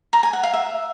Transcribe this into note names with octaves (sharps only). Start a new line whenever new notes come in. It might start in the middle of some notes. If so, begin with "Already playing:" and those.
A#5
G#5
F#5
F5
E5